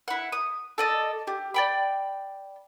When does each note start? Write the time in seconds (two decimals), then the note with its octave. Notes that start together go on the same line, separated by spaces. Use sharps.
0.08 E4 F#5
0.32 D#6
0.78 A4 D5 D#5
1.27 G4
1.54 D5 G5 B5